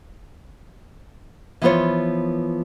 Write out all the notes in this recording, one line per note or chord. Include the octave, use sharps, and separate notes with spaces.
E3 F3 B3 F4 C5 C#5